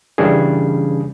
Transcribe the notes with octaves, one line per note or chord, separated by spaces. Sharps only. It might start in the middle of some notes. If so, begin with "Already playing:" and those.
C#3 E3 G3 C#4 D4 G#4